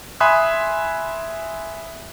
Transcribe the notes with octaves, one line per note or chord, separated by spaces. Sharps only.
E5 G#5 B5 C6 D#6 F#6